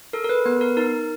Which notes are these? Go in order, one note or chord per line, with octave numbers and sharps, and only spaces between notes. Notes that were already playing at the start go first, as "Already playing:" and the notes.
A4 A#4
A#4
B4
B3 B4
A#4
D#4 A#4